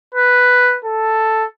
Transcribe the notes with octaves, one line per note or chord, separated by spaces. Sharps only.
B4
A4